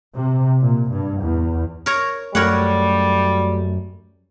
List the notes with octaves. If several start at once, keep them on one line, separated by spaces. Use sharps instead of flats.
C3
A#2
G2
E2
A#4 C#5 A#5
F#2 G3 A3 A#4 C#5 F#5